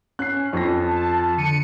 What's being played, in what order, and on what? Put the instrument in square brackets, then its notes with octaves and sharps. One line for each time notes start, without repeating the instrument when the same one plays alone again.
[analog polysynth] C#4 [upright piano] F#6 C7
[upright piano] F2 F3 A#6
[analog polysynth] A5
D3 C#7 D#7